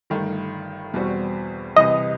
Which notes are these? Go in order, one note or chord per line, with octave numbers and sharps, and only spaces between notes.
G1 G2 D#3 A3
E2 B2 G3 C4 F#4
C2 C3 E3 D#5